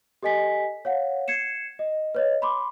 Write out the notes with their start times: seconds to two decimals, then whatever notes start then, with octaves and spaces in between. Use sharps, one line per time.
0.23 G4 A4 D#5 G#5 B6
0.85 C#5 F5 F#5
1.28 G#6 C7 C#7 E7
1.79 D#5
2.15 B4 C#5 D#5
2.42 B5 C6 D6